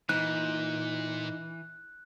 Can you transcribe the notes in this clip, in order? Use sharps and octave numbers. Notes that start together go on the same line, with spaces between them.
A#2 E3 D#4 F#6